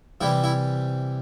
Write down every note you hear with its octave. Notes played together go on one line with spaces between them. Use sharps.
C3 E3 G3 E4
E4